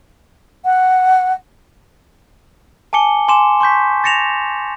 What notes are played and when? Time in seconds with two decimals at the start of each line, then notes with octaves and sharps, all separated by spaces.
0.65 F#5
2.93 G#5 A5 D6 C#7 G7
3.28 G#5 C6 D6 E7
3.60 C6 C#6 G6 B6
4.04 A6 A#6 C#7 E7 F7